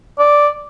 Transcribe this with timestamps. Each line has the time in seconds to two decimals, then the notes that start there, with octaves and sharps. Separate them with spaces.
0.19 D5